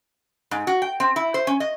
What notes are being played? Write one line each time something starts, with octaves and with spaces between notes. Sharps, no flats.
G#2
F#4
G5
C4
E4
C5
C#4
D#5